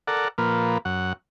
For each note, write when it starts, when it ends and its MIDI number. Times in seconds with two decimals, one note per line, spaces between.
0.07 0.28 69
0.07 0.28 70
0.07 0.28 74
0.07 0.28 78
0.38 0.78 46
0.38 0.78 53
0.38 0.78 58
0.38 0.78 71
0.85 1.13 42
0.85 1.13 78